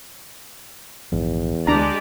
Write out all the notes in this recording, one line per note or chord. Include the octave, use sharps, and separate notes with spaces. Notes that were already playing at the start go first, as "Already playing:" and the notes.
A#1 E2 G#2 F3
D2 G#3 D4 G4 D5 A#5